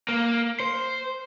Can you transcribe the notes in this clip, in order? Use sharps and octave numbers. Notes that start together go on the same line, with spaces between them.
A#3
C5